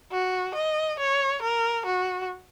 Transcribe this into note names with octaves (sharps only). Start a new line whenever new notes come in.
F#4
D#5
C#5
A#4
F#4